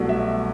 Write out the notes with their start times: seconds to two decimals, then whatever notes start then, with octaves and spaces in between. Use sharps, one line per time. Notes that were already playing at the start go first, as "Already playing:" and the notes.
Already playing: C2 B2 F#3 A3
0.09 E5